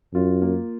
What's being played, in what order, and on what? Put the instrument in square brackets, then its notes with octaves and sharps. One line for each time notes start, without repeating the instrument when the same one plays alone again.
[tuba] F#2 [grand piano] F4
[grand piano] A#3